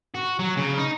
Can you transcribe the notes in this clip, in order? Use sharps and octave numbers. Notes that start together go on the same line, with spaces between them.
F#4
F#3
C#3
D#4